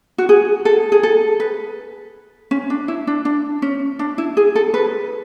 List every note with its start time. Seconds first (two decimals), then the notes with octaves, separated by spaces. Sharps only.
0.18 F#4
0.29 G#4
0.65 A4
0.92 G#4
1.03 A4
1.40 B4
2.51 C#4
2.70 D4
2.88 E4
3.07 D4
3.25 D4
3.62 C#4
3.99 D4
4.18 E4
4.37 G#4
4.56 A4
4.74 B4